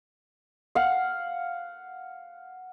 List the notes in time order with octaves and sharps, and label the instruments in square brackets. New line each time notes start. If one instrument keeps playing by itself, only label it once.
[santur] F5 F#5